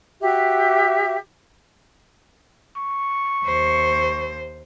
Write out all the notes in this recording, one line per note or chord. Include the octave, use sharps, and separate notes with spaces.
F#4 G4 E5
C#6
D#2 C5